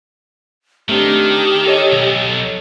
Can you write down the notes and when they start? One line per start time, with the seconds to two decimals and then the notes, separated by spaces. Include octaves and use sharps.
0.89 D#3 A3 C4 D4 G4
1.66 A4 C#5 D#5
1.92 B1